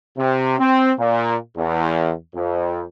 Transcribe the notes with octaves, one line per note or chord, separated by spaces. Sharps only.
C3
C4
A#2
E2
F2